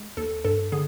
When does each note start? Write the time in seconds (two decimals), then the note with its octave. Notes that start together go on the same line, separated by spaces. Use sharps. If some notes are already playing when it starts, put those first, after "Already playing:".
Already playing: G#3
0.17 D#2 A4
0.44 G2 A4
0.72 D3 G#4